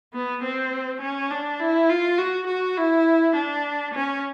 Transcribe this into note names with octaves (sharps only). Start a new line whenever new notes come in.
B3
C4
C#4
D4
E4
F4
F#4
F#4
E4
D4
C#4